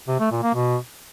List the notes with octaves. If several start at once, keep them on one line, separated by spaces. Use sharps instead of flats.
C3
A3
A#2
A#3
B2